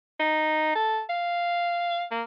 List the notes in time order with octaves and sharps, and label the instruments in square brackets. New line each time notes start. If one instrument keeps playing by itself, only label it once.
[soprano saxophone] D#4
A4
F5
A#3